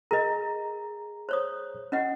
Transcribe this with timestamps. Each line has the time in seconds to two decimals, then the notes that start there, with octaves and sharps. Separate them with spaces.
0.11 G#4 A#4 D#5 A#5
1.29 C5 C#5 D#6
1.92 C#4 D#5 F#5